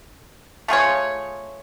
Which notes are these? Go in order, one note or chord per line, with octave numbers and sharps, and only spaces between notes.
A3 F4 G#4 C#5